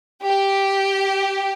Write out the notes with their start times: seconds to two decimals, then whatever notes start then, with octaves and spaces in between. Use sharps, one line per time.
0.24 G4